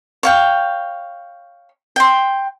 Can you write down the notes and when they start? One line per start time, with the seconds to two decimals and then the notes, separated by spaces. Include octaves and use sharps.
0.23 C#5 F5 G5
1.96 G5 C6